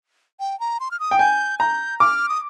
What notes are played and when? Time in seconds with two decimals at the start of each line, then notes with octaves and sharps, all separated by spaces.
0.40 G5
0.60 A#5
0.80 C6
0.91 F6
1.00 D#6
1.11 G5
1.19 G#5 G6
1.59 A#5 G6
2.00 D6 F6
2.29 D#6